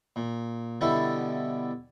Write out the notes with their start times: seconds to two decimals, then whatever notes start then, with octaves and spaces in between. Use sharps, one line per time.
0.16 A#2
0.81 B2 D3 G3 B3 E4 A4